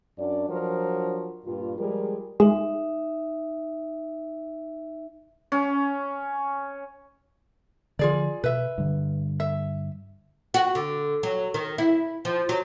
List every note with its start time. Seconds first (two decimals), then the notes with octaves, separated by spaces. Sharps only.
0.19 F#2 D4 D5
0.50 F3 F#3 D4 A#4 C5
1.46 G2 A#2 F4
1.78 F3 G3 G#3 G#4 A#4
2.40 G#3 D#4 E5
5.52 C#4
7.99 D3 F3 F4 G#4 D5
8.44 B2 B4 E5
8.78 G2 D3
9.40 E5
10.54 F#4
10.75 D3
11.23 F#3
11.54 D#3
11.78 E4
12.25 F3
12.49 F#3